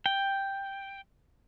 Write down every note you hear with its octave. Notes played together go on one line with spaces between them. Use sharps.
G5